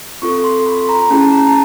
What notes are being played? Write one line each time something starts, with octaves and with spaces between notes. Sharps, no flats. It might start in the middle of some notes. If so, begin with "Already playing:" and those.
C4 F4 A4 C#6
C6
B5
A#5
A3 C#4 E4 G#4 A5
A#5
A5